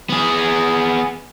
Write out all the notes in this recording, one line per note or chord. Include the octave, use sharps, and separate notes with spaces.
B3 G#4